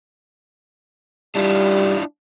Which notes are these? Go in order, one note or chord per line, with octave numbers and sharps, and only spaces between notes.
G3 D4 E4 F4